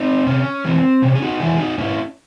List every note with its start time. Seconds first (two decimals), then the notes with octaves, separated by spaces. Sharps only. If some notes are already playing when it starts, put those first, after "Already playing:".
Already playing: C4 D#4
0.27 C3 C#4
0.65 E3 G#3 C4
1.02 C3 C#4
1.15 G#4
1.22 D#4 F#4
1.40 E3 G#3 E4 G#4
1.59 D#4 F#4
1.78 G#2 C#4 E4